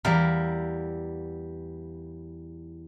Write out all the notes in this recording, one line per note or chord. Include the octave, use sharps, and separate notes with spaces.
E2 G3 E4 A#4 F5